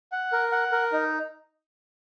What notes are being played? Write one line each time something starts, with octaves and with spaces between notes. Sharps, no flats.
F#5
A#4
F#5
A#4
D#4